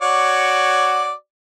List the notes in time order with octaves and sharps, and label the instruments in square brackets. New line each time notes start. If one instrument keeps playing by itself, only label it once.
[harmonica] F#4 C#5 D5